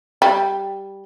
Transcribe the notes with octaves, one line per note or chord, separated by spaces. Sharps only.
G3